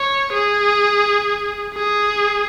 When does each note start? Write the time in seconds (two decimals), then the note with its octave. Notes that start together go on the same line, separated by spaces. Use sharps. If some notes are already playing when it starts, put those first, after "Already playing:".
Already playing: C#5
0.33 G#4
1.75 G#4